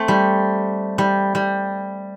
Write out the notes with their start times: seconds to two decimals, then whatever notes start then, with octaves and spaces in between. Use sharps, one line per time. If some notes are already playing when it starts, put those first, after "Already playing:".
Already playing: A3 C4
0.08 G3
0.98 G3
1.35 G3